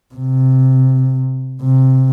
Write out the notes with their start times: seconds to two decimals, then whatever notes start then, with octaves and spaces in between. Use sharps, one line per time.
0.14 C3
1.62 C3